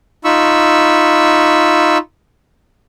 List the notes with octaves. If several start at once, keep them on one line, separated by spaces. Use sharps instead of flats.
D#4 F4 B5 C#6 E6